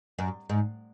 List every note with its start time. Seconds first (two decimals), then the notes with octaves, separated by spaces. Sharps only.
0.19 F#2
0.49 G#2